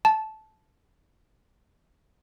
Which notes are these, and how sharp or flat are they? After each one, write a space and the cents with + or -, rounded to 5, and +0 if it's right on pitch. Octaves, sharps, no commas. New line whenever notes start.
A5 -15